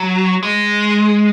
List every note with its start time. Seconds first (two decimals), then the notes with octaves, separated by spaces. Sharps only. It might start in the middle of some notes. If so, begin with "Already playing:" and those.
Already playing: F#3
0.43 G#3